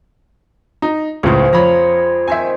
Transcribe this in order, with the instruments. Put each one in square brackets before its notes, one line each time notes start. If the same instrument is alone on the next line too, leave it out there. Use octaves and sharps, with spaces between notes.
[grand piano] D#4
[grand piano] C#2 A2 C#3 [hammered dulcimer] F3 G#3
[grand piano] F2 B5 [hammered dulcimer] C#5 A#5
[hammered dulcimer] D#3 C4 [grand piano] E5 G#5